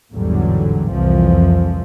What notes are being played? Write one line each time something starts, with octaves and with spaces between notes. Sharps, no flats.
A1 E2 G#2 D3 F#3 G3
C2 F2 E3 F3